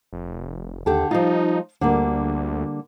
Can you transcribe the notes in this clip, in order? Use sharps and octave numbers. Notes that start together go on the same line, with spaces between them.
F1
D#2 D3 G4 A4
F3 G3 D#4 F4
D2 D3 G3 A#3